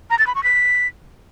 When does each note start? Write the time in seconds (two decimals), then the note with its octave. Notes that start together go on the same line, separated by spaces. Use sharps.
0.10 A#5
0.19 A6
0.27 B5
0.35 C#6
0.43 B6